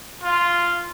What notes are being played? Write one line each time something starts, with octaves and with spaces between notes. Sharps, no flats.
F4